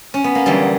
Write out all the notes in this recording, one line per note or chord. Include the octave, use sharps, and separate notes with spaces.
C#4
B3
A#3
E2 D3 F#3 G3